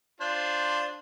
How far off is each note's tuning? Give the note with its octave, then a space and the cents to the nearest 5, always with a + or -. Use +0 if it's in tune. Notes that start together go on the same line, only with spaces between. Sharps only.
D4 +0 F4 +0 C5 +0